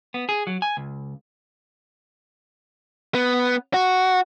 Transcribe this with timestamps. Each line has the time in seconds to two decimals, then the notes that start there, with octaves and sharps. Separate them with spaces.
0.14 B3
0.29 G#4
0.47 F#3
0.62 G#5
0.77 C#2
3.15 B3
3.74 F#4